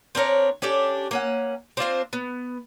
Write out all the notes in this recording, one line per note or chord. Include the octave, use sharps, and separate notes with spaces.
C4 D4 A#4 C#5
C#4 D4 G4 A4
A#3 C#4 F#5
C4 D4 F4 C5
B3